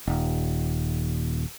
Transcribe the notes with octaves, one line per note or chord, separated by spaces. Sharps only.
D#1